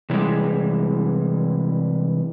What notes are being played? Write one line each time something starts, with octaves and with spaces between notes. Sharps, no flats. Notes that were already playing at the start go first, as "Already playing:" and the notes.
C3 E3 G3 G#3